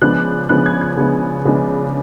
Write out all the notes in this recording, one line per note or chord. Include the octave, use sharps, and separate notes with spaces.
C#3 F3 G#3 B3 D4 F#6
C#3 F3 G#3 B3 D4 F#6
G#6
G#6
C#3 F3 G#3 B3 D4
C#3 F3 G#3 B3 D4